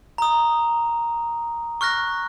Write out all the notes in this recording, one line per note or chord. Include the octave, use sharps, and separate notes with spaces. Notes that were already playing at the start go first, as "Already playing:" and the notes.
A#5 D#6
C#6 F6 F#6 A#6